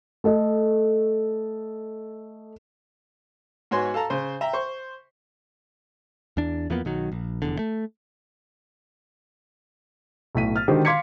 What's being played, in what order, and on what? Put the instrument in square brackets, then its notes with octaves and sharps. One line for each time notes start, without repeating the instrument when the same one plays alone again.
[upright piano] A3 A4 D#5
[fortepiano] G#2 B3 F#4 C#5 G#5 C6
A4 F5 A5 A#5
C#3 C5
E5 G5 A#5
C5 C#6
[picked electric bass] E2 D4
E2 F3 A#3 B3
B1 D#3 F#3
A#1
F1 E2 D3
A3
[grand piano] B1 A2 B6 D#7
F6 A6
D3 D#3 G#3 F#4 G4 C5
F5 C6 D6 G#6 B6 C#7